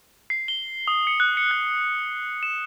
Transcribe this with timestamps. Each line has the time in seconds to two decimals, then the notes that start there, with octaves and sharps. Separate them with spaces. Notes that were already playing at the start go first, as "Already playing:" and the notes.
0.30 C7
0.48 G7
0.88 D#6
1.07 C#7
1.20 F#6
1.37 C#7
1.51 F#6
2.43 E7